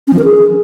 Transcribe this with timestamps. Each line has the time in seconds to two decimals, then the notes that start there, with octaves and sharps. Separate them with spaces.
0.07 C#4
0.13 F3
0.19 A#4
0.24 G#4